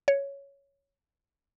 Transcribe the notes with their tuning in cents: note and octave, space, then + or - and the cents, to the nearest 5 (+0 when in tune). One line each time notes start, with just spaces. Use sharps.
C#5 +5